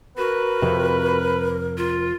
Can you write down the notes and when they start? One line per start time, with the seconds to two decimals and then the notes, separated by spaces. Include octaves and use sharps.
0.18 F#4 A#4 B4
0.62 F2 C3
1.77 F4